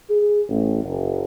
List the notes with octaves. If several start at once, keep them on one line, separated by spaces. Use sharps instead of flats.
G#4
A1
F#1